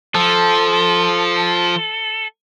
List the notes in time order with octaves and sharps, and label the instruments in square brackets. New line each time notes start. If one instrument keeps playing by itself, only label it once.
[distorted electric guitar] F3 [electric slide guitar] A4